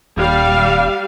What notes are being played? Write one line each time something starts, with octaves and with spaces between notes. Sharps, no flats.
D#1 G3 F5